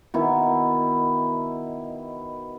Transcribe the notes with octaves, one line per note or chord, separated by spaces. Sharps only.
B2 D#3 E4